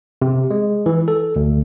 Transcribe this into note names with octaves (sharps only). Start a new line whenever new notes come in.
C3
G#3
E3
A4
D2